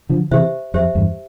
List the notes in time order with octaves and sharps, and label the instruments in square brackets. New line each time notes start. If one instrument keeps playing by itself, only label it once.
[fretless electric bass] D3 F3
[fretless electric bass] C3 E3 [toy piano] G4 C5 E5
[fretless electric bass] F2 [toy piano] G4 C5 E5
[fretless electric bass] E2 G2